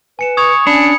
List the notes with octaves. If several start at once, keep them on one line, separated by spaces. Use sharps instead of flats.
B4 G#5 C#7 E7
C#6 D#6 G#6 F7
C#4 D4 B5 C#7